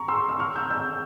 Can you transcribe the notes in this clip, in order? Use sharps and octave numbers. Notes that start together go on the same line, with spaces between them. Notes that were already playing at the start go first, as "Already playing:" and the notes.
Already playing: A#5 C#6
C6 E6
E6
C#6 F6
E6 G6
E6 G6